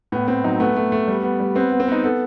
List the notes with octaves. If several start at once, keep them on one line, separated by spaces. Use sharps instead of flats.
A2 B3
A2 C4
F#3 D#4
A3 B3
A3
A3
G3
B3
G3
B3 C4
B3
C4
B3 D#4
B3 A4